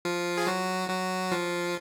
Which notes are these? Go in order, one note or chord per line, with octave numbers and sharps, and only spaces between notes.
F3 F4
G#4
F#3 F#4
F#3 F#4
F3 F4